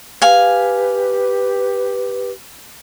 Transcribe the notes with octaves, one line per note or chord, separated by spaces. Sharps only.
G4 B4 F5 G#5